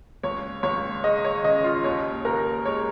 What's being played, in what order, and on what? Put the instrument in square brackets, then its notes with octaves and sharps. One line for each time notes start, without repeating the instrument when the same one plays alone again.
[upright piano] C#2 C#5
C#2 C#5
G#3 D#5
C#5
C#3 D#5
F4
D#2 C#5
D#2 A#4
G#3 C#5